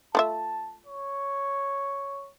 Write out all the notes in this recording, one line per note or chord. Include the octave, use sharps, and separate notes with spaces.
A3 F4 E5 A5
C#5